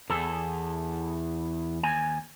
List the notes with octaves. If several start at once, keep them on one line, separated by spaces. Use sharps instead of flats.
E2 A4
D#2 G#5